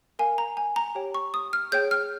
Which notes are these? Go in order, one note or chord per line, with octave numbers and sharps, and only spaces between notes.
A#4 F5 G#5
A#5
G#5
A#5
G4 C#5 G5
C#6
D#6
F6
G#4 C#5 G5 G6
F6